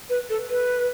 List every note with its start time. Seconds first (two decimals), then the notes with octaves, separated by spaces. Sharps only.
0.10 B4
0.30 A4
0.49 B4